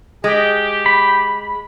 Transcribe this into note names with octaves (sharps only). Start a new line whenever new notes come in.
G#3 G4
B5